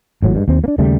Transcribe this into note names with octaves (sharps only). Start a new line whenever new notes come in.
G#1 A2 F#3
G2 D#3 G#3
D#2 C4
A#3 D4
D#2 C#3 G3 A3